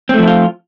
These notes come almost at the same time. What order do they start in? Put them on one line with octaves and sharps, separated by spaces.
C4 A3 F3 E4 F4